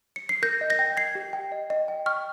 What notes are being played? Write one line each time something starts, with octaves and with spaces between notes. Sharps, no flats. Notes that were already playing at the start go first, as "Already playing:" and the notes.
C#7
C7
A#4 G6 A#6
D#5
G6 A#6
G5
D#5 G#6 C7
G4
G5
D#5
D#5
G5
G5 C#6 F6